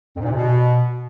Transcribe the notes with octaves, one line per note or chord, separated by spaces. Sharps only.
F2
G#2
A#2
C3
B2